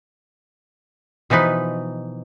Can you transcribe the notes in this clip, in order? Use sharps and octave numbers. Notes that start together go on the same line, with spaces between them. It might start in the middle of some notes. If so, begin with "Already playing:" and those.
B2 E3 F3 D#4 B4